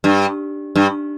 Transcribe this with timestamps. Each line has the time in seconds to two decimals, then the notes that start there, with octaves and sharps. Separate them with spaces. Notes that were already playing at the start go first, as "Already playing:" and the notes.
0.04 G2
0.76 G2